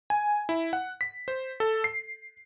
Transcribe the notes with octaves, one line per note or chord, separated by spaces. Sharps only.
G#5
E4
F#5
B6
C5
A4
C7